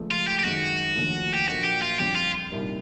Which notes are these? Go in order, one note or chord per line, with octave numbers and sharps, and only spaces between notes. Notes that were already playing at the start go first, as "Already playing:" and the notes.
Already playing: C#2 C#3 F3 A3
F4
G4
G4
F#2 D#3 G#3 F#4
D#2 D3 F3 A3
G4
A#1 A#2 F#3 A#3 F#4
G4
F4
F2 D3 G3 G4
F4
C2 A#2 G3 A#3 D#4